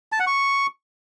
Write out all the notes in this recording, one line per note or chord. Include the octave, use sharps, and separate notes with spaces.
A5
F#5
C#6